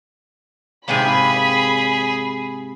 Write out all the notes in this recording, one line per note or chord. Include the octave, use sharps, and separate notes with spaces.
G#2 C3 A#3 G#4 B5